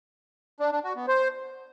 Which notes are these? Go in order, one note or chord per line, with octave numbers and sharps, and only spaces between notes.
D4
D4
F#4
B3
C5